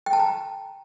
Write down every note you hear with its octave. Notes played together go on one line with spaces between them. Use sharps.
G5
A5
A#5